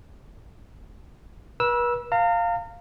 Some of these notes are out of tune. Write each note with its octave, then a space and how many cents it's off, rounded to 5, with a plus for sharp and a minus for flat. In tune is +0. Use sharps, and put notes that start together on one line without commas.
B4 -40 E6 +0
F5 +0 A#5 -40